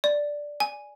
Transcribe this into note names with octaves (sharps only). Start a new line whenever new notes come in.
D5
G#5